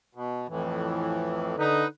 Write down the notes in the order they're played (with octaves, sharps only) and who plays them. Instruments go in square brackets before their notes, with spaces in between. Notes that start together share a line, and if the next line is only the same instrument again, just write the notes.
[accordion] B2
F2 A2 E3
[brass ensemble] D3 D#4 [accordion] B4